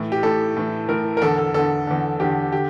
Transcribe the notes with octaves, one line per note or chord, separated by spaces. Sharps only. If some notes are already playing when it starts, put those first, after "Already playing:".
Already playing: A2 E3
G4
A2 E3 A4
A2 E3
A2 E3 A#4
A#4
E2 D3 A4
A4
E2 D3 A4
E2 D3
E2 D3 G4
D3 G4